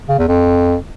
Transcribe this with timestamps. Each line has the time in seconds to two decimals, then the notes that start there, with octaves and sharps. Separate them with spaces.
0.09 C#3
0.19 E2
0.28 F2